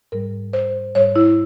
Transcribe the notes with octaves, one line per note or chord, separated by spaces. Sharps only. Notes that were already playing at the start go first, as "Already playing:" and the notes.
G#2 G3 A#4
C5
G#2 G3 C#5
E4